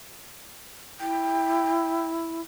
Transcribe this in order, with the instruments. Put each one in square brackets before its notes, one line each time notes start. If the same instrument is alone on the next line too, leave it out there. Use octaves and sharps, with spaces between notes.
[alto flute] E4 [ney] G5